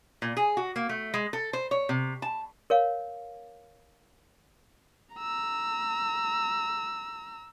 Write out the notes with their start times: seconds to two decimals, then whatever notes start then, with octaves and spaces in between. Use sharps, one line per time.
0.22 A#2
0.37 G#4
0.57 F#4
0.76 A#3
0.89 A3
1.14 G#3
1.33 A4
1.53 C5
1.71 C#5
1.89 C3
2.22 A5
2.70 A#4 C#5 F5
5.15 A#5 E6